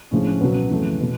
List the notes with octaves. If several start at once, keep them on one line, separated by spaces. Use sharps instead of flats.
A#1 A2 F3 G#3 C#4
C#4
C#2 B2 F#3 B3
F2 C#3 E3 A3
B2